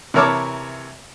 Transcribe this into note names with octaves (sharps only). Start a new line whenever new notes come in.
C3 E3 A#4 C#5 A5 D6